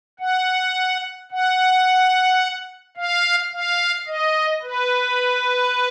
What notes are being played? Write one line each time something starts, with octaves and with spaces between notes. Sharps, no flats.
F#5
F#5
F5
F5
D#5
B4